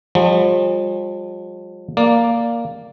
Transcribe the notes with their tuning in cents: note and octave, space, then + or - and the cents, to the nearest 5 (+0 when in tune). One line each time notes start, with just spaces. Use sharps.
F3 +35 G#3 -45
A#3 +0 D5 +0